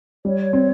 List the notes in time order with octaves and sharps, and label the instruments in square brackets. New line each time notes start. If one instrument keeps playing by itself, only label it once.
[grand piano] G3 [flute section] C#5
[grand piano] C4